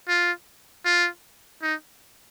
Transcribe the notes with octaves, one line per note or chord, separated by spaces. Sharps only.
F4
F4
D#4